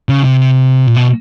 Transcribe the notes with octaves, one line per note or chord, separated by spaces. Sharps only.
C#3
C3
A#2
B2